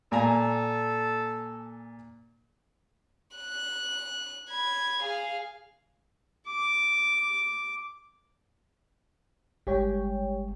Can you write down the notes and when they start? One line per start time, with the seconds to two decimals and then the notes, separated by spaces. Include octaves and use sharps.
0.12 A#2 A4 G#5 A#5
3.37 F#6
4.50 B5 G#6
5.02 G#4 F5
6.47 D6
9.67 G1 G3 G#3 G4 C#5 G5